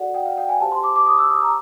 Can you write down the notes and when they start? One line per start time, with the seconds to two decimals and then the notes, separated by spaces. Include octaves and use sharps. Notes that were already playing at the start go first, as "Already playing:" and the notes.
Already playing: F#4 A4 D5 F#5
0.14 G5
0.26 F5
0.37 G5
0.49 G#5
0.61 G4 C5 A5
0.72 C6
0.83 D6
0.96 D6
1.06 D#6
1.18 E6
1.30 D#6
1.42 A#5